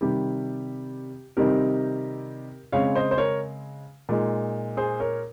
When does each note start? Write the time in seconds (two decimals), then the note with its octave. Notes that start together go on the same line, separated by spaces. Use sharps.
0.01 C3 D#3 G3 G4
1.37 C3 D#3 G3 C4 D#4 G4 A#4
2.72 C#3 G#3 C4 C#5 F5
2.95 C5 D#5
3.11 C5
3.18 A#4 C#5
4.09 A#2 G#3 D#4
4.77 G#4 C5
5.00 A#4 C#5